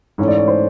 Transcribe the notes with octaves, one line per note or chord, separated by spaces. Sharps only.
G#2 E3 A3 C#4 C#5
D5
C#5
C5